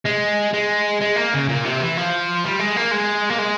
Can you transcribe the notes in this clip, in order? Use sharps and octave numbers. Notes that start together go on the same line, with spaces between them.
G#3
G#3
G#3
A#3
C#3
A#2
C3
E3
F3
G3
G#3
A#3
G#3
A#3
G#3